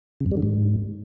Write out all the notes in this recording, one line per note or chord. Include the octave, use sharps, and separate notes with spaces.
C#3
F#2
G3
D3
G#2